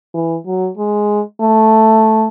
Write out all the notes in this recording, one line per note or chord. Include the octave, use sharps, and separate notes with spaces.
E3
F#3
G#3
A3